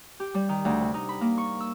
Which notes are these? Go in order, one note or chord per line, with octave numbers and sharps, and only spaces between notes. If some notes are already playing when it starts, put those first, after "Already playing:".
G4
G3
D#3
D2
C3
D#4
B5
A#3
C#6
E6